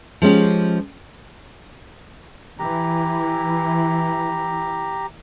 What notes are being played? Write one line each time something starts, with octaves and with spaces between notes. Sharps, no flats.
F3 G#3 C#4 G4
E3 G4 A#5